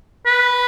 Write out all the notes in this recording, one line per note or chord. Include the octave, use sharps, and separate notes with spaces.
B4